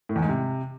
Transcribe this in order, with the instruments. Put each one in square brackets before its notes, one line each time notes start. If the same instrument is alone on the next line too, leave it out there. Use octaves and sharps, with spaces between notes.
[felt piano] A2
E2
G#2
C3